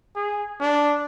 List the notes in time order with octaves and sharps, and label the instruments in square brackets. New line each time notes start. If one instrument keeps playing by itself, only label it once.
[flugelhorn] G#4
D4